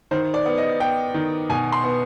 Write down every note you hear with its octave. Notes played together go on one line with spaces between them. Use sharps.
D#3 C5
D5
B3
D#5
B3 G5
D#3
B2 G#5
C6
B3